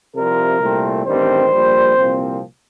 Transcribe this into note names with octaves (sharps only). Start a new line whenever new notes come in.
C2 C3 F3 A#4
C2 A#2 A3 C4
A1 G2 D#3 G3 C4 C5
A#1 A#2 G3
C2 A#2 F3 C4